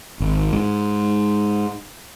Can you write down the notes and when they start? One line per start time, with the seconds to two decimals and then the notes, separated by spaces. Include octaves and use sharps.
0.20 G#1
0.53 G#2